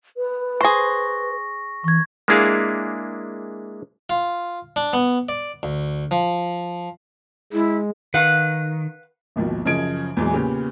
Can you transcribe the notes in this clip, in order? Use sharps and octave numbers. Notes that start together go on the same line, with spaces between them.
B4
G#4 C5 C#6 A#6
E3 C#6 G#6
G#3 A#3 D4 E4 G#4 F5
F4
D4
B3
D5
D2
F3
G#3 E4
D#3 B4 F5 F#5
G#1 D#2 B2 F3
F#2 C#3 F3 D#5 G#6 D7
E2 A#2 E3 F#3 G#3
A#2 C#3 B3 G4